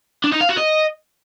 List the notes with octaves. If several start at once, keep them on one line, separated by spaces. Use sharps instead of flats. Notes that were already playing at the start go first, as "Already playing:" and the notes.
D4
D#4
F5
F#4
D#5